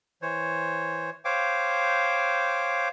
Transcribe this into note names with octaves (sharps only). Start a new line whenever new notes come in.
E3 C5 C#5
C5 C#5 F5 G5 D6